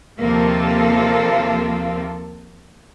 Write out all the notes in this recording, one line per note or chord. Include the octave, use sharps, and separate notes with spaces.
D#2 C3 F3 A#3 F4 A4